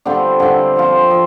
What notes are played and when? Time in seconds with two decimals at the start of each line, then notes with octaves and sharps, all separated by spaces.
0.05 D3 G3 C4 F4
0.40 D3 G3 C4 F4
0.76 F3 C4 F4
1.11 F3